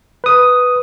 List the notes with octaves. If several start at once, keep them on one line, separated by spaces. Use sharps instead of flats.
B4 D#6